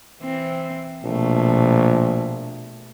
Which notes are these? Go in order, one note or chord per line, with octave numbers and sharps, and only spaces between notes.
E3 C4
A#1 B2 A3